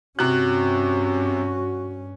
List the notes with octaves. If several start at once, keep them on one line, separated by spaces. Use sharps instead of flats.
G2 C3 C#4 F#4 F#6